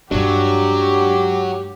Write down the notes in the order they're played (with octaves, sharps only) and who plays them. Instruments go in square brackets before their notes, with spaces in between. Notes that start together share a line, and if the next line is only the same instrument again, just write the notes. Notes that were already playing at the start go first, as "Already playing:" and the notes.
[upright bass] G2 G#3 [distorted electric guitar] F#3 [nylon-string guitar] D4 [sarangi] G4